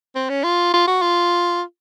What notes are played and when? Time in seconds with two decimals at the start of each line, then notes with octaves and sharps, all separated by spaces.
0.15 C4
0.30 C#4
0.44 F4
0.74 F4
0.88 F#4
1.02 F4